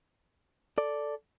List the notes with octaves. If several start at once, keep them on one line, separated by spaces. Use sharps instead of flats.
A4 D5